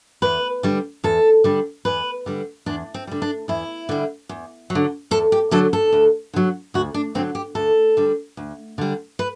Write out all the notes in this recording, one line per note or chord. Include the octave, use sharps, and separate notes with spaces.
E2 B4
D3 G3
E2 A4
D3 G3
E2 B4
D3 G3
E2 D4
C4
D3 G3
D4
E2 E4
D3 G3
E2
F#3
D3
E2 A4
G4
D3 F#3 A4
A4
D2
D3 F#3
D2 F#4
D4
D3 F#3 C4
G4
D2 A4
D3 G3
D2
D3 G3
B4